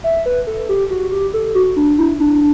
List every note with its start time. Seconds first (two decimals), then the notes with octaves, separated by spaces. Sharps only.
0.04 E5
0.26 B4
0.47 A4
0.69 G4
0.90 F#4
1.12 G4
1.34 A4
1.55 F#4
1.76 D4
1.98 E4
2.20 D4